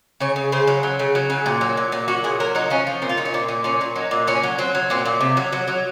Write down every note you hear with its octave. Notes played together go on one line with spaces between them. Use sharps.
C#3 C#5
C#3
C#3 C5
F#3
F#3
C#3
F#3
C#3
A#2
F#3
A#2
A#2
F#3 F#4
A#2 G#4
F#3 A#4
F#3 D#4
F3 C#4
F3
A#2 C4
F4
A#2 D#4
C#4
A#2 C4
A#2
A#2 C#4
A#2
F#3 D#4
A#2
A#2 C#4
F#3
F#3 C4
F#3
A#2 C4
A#2
C3
F#3
F#3
F#3